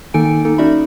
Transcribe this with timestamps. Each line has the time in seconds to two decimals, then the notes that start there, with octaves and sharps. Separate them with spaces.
0.14 D#3 A#3 D#4 A4 G#5 D7
0.45 A#3 D#4 A4
0.58 C#4 D#4 F#4 D5 E5 B5